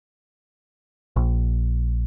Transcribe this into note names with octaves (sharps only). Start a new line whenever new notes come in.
A#1